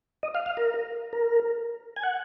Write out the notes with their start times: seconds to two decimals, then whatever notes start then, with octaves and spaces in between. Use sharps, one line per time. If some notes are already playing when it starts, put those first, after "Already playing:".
0.23 D#5
0.35 F5
0.46 F5
0.57 A#4
1.13 A#4
1.96 G#5
2.03 F#5